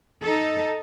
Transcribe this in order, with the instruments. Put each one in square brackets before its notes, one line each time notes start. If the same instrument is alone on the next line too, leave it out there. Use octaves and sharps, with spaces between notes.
[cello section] D#4 A4